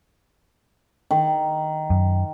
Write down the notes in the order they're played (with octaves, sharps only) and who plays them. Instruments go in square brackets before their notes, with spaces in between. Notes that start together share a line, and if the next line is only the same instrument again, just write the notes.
[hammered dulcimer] D#3
[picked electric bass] F#2